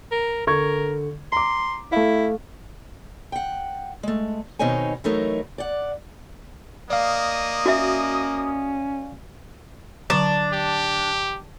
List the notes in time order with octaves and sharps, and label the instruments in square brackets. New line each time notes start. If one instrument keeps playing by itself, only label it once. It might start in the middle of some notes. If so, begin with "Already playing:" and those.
[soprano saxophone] A#4
[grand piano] D3 C#6 G#6 [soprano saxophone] A#4
[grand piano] A#5 D6 [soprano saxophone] C6
[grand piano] A3 F5 [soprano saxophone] E4
[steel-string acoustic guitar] F#5 G5
G#3 A3
B2 D#3 C4 D#4 C#5 G#5
E3 F#3 A3 D#4 A#4 C#5
D5 F#5
[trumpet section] A#3 D#5 D#6 [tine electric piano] D5 F5
[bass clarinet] C#4 [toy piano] F#4 E5
[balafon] D3 F#3 C#6 [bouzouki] D4
[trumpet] G4